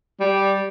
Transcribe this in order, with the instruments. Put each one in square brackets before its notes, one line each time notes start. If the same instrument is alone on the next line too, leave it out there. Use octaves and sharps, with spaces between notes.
[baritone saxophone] G3